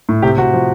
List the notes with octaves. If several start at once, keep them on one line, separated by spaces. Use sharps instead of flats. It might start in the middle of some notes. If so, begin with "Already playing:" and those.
A2
C3 G4
C3 F#4
F3